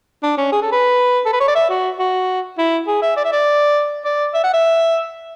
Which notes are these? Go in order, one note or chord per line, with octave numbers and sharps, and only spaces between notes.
D4
C#4
G#4
A4
B4
A4
B4
C#5
D5
E5
F#4
F#4
E4
G#4
E5
D5
E5
D5
D5
E5
F#5
E5